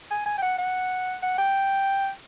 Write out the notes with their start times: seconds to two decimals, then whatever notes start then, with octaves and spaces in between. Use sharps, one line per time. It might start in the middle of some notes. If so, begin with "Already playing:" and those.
0.10 G#5
0.26 G#5
0.37 G5
0.42 F#5
0.58 F#5
1.22 F#5
1.38 G5